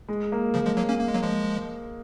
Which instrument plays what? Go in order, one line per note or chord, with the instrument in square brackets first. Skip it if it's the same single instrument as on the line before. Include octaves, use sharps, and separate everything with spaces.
[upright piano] G#3
A#3
[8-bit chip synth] C#3 F3
F3 G#3
F#3 A#3
A#3 C#4
A#3
G#3
F#3 A#3
F3 G#3